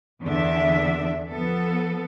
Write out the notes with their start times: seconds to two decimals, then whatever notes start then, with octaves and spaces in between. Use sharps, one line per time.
0.24 E2 D3 D4 E5
1.30 F3 B3 A4